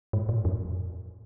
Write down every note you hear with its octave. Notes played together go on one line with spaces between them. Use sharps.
G#2
A2
F2